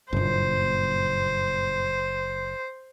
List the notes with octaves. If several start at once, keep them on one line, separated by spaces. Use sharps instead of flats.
F#1 G2 A#2 C5